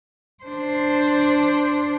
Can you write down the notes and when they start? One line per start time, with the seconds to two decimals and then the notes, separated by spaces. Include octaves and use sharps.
0.44 D4 C5